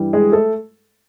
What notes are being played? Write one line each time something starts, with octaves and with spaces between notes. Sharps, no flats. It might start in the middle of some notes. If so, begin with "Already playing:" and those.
Already playing: G2 E3 G3
G#3 G#4
A3 A4